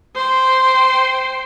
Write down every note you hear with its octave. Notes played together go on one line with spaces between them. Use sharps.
C5 G5